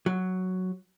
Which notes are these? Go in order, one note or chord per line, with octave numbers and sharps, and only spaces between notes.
F#3